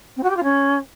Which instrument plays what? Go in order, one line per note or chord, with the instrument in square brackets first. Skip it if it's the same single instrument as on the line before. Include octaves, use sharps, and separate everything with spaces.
[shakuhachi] C4
F#4
G4
F4
C#4